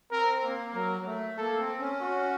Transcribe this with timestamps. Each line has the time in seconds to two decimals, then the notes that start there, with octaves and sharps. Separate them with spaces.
0.11 C4 A#4
0.43 A#3
0.74 F#3 A#4
1.01 F#3
1.06 A3
1.38 A#3 A4
1.59 C4
1.80 C#4
2.01 F#4